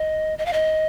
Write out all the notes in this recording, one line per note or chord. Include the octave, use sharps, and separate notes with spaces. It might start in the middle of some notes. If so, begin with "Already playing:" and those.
Already playing: D#5
D#5
F5
D#5